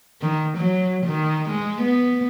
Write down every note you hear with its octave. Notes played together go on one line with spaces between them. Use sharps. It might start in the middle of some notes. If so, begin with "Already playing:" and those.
D#3
F#3
D#3
G#3
B3